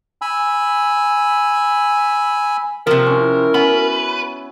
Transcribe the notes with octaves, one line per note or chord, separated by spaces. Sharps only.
G#5 B5 E6
C3 F3 A#4
C#4 E4
B3 C#4 F#4 B4